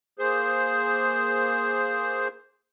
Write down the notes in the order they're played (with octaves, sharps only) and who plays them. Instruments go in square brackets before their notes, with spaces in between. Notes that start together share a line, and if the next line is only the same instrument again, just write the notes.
[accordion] A#3 G#4 C5